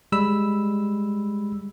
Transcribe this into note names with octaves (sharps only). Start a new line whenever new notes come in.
G3 G#3 B5 E6